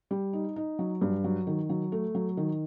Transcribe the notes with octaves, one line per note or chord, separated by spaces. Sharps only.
G3
D#4
D#4
F#3
G2
F#3
D#3
F#3
A3
F#3
D#3